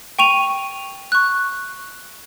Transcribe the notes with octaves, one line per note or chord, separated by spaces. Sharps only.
G5 C#6 D#7 F7
C#6 F#6